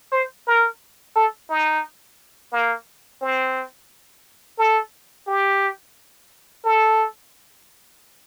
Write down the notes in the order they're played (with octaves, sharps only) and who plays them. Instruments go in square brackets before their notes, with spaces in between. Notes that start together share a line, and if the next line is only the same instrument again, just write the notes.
[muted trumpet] C5
A#4
A4
D#4
A#3
C4
A4
G4
A4